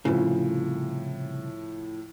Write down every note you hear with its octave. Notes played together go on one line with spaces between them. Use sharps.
C2 A2 C#3 F3